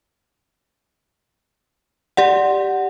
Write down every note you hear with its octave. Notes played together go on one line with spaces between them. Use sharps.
G4 D5 F#5